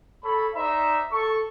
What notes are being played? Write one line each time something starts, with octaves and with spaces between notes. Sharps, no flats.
A4 C#5 B5
D#4 C5 D5 E5 A#5
A4 C#6